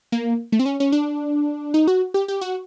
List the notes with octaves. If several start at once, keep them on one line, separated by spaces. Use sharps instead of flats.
A#3
A3
C4
C#4
C#4
D4
D#4
F#4
G4
G4
F#4